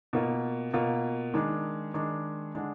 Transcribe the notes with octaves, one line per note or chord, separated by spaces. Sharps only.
B2 A#3 F4
B2 A#3 F4
D#3 G#3 D4
D#3 G#3 D4
D3 G#3 D4